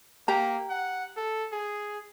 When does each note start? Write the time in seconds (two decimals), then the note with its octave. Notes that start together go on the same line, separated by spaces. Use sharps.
0.28 A#3 G4 A#5
0.70 F#5
1.17 A4
1.52 G#4